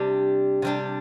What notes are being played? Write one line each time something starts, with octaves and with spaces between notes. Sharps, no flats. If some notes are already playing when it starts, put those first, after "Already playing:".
Already playing: C3 G3 D4
C3 G3 D4